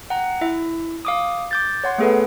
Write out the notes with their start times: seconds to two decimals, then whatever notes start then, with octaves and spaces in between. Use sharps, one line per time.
0.10 F#5 G5 A#5
0.41 E4 E5
1.05 F5 D6 D#6
1.51 D6 G6 A6
1.84 C#5 F#5 C6
1.98 A3 B3 G#4 A4 B4